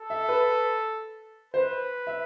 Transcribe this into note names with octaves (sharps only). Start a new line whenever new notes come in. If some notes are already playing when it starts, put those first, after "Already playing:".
Already playing: A4
E5
B4
B4 C5
E5